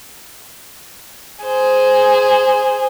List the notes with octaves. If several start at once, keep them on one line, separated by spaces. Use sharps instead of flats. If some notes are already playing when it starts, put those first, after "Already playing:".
G#4 C5